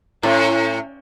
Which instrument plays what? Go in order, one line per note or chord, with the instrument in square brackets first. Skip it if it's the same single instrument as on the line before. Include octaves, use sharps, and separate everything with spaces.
[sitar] A2 [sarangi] C#4